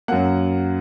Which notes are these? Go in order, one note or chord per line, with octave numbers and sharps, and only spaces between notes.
F#2 F#3 A#3 F#5